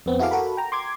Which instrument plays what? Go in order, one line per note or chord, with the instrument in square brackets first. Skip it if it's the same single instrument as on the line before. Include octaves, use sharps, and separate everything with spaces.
[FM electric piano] F2 B3 C4
E4 F#4 G#4 A4 F5 D6
F#4 A4 A#4 B5
G5 A#5
C6 D6 G#6